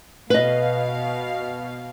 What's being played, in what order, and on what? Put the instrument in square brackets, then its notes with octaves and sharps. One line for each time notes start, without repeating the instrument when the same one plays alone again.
[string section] B2 F5 [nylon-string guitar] B4 D#5